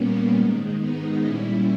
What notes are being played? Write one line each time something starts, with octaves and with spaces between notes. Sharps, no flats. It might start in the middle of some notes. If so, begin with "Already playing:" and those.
Already playing: A#2 G3 A#3 B3 C#4
G#2 D#3 G#3
B3 D#4
A#2 G3 C#4 E4